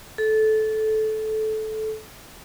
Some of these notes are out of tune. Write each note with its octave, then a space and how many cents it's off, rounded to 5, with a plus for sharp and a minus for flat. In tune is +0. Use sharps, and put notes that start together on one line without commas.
A4 -15